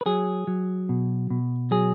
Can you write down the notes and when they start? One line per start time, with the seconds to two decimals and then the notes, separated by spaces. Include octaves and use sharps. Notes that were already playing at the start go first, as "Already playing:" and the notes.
0.01 B4
0.06 F#3 G#4
0.47 F#3
0.89 B2
1.30 B2
1.71 F#3 G#4